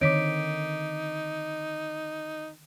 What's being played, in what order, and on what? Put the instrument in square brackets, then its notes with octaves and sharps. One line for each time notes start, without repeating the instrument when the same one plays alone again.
[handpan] D3 D#3 C4 [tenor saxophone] D#4 [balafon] C#5 [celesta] D6 B6 D7